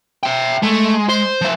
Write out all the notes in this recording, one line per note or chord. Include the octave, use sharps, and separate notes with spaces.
E5 G5
G#3 A3
C5
F3 E5